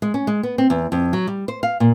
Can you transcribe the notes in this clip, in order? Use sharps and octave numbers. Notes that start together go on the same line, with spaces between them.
G#3
C#4
G#3
B3
C4
E2
F2
F#3
G3
C5
F5
A#2